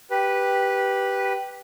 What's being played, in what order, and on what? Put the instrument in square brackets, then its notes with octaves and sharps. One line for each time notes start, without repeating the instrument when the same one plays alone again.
[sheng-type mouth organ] G4 B4